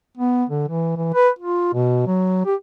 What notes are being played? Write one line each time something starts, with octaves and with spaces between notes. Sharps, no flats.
B3
D3
E3
E3
B4
F4
B2
F#3
G4